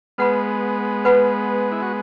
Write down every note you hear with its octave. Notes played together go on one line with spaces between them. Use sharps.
G#3 B3 B4 F#5 B5
B4 F#5 B5
E4
F#4